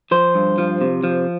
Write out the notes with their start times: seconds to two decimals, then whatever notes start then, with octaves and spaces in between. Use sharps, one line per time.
0.11 F3 C5
0.35 G2
0.58 F3
0.81 C3
1.04 F3